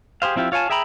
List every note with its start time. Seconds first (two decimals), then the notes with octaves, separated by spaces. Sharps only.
0.22 G4 G#4 C5 F5
0.36 F3 C4 E4 F4 G4
0.52 F4 C#5 F5 G#5 A5
0.70 G#4 E5 G5 A#5 B5